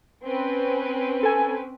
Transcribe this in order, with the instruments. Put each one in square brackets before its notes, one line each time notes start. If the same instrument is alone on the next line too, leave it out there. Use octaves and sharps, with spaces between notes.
[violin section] C4 C#4 B4
[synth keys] A4 G#5